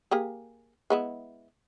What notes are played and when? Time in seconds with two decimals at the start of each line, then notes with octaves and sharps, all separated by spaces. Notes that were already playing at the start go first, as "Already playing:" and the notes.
0.11 A#3 G4 G#4
0.90 G#3 B3 E4